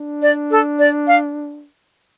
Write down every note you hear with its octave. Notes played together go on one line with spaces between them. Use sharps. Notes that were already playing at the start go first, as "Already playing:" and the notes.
Already playing: D4
D5
A4
D5
F5